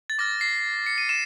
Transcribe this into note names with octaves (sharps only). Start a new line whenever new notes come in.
A6
D6 F6 A#6
C7
C#7
D#7
D6 F6 E7